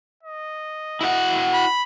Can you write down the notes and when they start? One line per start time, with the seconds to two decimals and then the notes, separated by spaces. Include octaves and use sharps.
0.23 D#5
1.01 E4 F#4 F#5
1.54 B5